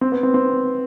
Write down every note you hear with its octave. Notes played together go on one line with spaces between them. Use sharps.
C4
B3
C4
C4